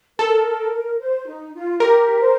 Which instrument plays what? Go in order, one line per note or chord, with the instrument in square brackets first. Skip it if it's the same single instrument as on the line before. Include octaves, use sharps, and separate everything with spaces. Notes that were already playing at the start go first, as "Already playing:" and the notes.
[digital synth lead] A4 [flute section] A#4
[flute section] C5
D#4
F4
[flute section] G4 [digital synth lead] A#4
[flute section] C5